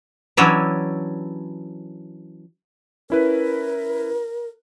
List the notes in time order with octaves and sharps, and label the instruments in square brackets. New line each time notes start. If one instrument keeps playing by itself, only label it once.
[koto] E3 F#3 C#4 D4 E4 G4
[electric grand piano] C#4 E4 B4 [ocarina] A#4